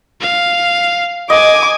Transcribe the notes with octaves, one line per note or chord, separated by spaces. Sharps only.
F5
D#5 G#5 D6